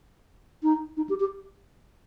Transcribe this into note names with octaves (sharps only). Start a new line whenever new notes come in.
D#4
D#4
G4
G4